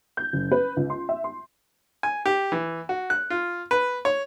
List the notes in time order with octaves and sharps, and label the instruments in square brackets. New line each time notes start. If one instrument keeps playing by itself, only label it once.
[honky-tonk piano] G6
F#1
B4
C#2
C6
E5
C6
[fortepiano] G#5
G4
E3
F#4
F#6
F4
B4
C#5